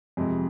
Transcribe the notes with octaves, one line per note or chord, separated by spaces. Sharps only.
F2 C3 G#3